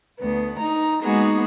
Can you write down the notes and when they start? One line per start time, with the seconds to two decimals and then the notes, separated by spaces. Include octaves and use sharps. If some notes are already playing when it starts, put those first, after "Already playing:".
0.20 D2 B3
0.59 D#4 A#5
1.03 G#3 A#3 B3 D#4 F#4 G#4